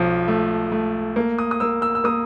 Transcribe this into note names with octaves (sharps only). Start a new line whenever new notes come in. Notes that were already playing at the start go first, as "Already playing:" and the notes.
Already playing: B1 F3
A3
A3
A#3
D#6
D#6
A#3 E6
E6
E6
A#3 D#6